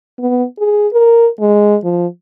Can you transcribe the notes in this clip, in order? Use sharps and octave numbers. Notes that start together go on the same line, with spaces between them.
B3
G#4
A#4
G#3
F3